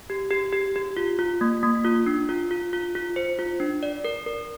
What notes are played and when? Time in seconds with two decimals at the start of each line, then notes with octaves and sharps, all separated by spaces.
0.10 G4
0.31 G4
0.53 G4
0.76 G4
0.97 F4
1.19 F4
1.41 A#3
1.63 A#3
1.85 F4
2.06 D4
2.29 F4
2.51 F4
2.73 F4
2.95 F4
3.16 C5
3.39 F4
3.60 D4
3.83 D5
4.04 A#4
4.26 A#4